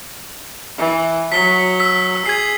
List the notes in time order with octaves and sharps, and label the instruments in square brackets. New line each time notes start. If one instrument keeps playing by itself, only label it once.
[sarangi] E3
[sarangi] F#3 [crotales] B6 G7
[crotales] E6 B6
[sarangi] G#4 [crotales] G#6 C7